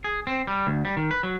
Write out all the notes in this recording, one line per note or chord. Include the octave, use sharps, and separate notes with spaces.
G#4
C4
G3
D2
G3
D#3
B4
F#3